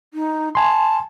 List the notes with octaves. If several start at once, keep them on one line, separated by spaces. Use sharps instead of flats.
D#4
G#5 A5 C6